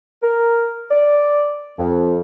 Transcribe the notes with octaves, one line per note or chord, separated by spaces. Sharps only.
A#4
D5
F2